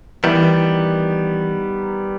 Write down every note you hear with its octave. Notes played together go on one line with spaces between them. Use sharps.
D#3 E3 G3 B3